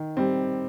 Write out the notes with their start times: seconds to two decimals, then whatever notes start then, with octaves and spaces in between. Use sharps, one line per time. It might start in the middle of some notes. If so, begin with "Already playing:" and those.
Already playing: D#3
0.17 G3 C4